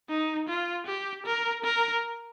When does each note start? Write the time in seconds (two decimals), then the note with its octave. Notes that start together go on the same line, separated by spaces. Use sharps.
0.10 D#4
0.49 F4
0.87 G4
1.26 A#4
1.64 A#4